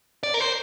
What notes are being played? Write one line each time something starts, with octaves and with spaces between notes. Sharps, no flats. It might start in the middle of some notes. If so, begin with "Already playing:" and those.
D5
A#4
C5